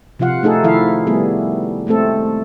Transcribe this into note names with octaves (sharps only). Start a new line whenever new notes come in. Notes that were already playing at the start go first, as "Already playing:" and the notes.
C3 F3 F4 F5 F#5
A3 D#4 G#4 A4
D#3 F3 E4 A4 E5 F5
G3 A3 B3 G#4
G#3 A3 C4 A4